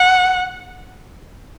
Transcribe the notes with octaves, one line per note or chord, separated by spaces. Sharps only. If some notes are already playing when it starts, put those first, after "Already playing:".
Already playing: F#5